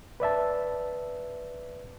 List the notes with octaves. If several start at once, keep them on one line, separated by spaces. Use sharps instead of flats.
B4 D5 E5 A5